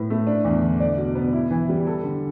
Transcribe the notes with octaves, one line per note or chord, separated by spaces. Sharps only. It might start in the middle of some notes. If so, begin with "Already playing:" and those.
Already playing: A2 B4
A3
D4
E2
D3
D5
B2
B3
E4
E3
G3
A4
D3